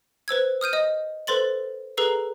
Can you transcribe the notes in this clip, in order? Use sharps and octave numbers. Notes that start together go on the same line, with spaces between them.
B4 C5 E6 G#6
D#6 F6 G6 D#7
D#5 D#6
A4 B4 C5 C6 A6 F#7
G#4 A4 B4 A#5 E6 C7